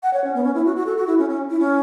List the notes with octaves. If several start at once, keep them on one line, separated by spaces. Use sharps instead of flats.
F#5
C#5
C#4
B3
C#4
E4
F#4
F#4
A4
F#4
E4
C#4
C#4
E4
C#4